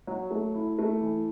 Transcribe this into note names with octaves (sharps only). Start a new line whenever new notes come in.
F#3
A3
E4
A3
E3